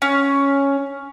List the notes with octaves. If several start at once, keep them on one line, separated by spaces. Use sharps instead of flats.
C#4